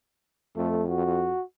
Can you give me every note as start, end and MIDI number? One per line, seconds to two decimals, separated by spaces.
0.57 1.33 41
0.57 0.84 57
0.89 1.44 66